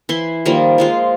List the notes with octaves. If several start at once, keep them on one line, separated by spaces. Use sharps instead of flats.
E3 E4 C6
D#3 F3 G3 A#3
F3 G#3 F4